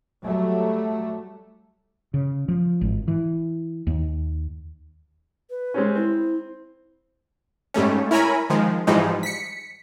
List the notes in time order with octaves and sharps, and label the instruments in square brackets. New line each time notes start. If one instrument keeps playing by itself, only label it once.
[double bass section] F#3 G3 A3
[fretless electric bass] C#3
F3
G#1
E3
D#2
[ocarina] B4
[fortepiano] G#3 C4 C#4
[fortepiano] C4 [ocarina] E4
[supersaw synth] G#2 G3 A3 C#4
E4 A#4 C#5 G#5 A#5 B5
D#3 F3 G#3
G#2 E3 F3 G3 G#3 D#4
B6 C#7